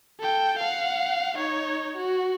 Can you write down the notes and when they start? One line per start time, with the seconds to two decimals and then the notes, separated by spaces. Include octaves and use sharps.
0.20 A4 G5
0.59 F5 F#5
1.37 D#4 C#5
1.97 F#4